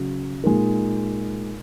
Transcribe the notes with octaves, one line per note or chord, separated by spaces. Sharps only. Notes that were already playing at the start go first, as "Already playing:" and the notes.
Already playing: C#3 F#3 C#4
A#2 G#3 D#4 A#4